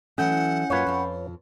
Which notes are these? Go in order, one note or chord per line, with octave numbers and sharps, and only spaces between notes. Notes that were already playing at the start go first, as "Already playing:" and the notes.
E3 F#3 A3 C#4 F#5 G6
F#2 A#3 F4 B4 C#5
F2 F4